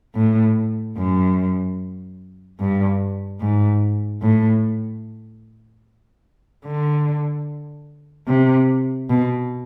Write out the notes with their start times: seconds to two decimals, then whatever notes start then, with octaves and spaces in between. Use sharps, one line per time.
0.16 A2
0.97 F#2
2.60 G2
3.41 G#2
4.22 A2
6.66 D3
8.27 C3
9.10 B2